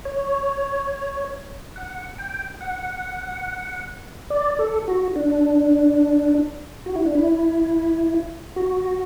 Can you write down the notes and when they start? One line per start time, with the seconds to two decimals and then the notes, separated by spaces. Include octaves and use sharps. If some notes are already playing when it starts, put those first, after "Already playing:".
0.05 C#5
1.76 F#5
2.18 G5
2.61 F#5
4.30 D5
4.59 A4
4.88 F#4
5.16 D4
6.86 F#4
6.95 E4
7.05 D4
7.15 E4
8.56 F#4